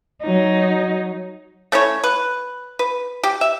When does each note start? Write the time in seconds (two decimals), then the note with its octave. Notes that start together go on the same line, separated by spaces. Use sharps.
0.22 F#3 D#4
1.72 A3 C#4 E4 C#5
2.03 B4
2.79 B4
3.23 G4
3.41 E5